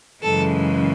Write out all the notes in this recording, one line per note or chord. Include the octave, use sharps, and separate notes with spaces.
F#2 C#3 E3 G#3 A4